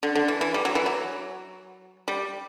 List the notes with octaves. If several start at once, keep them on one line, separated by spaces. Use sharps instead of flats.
D3
D3
E3
E3
G3
F#3
E3
F#3
G3